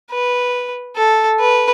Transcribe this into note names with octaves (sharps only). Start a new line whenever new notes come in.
B4
A4
B4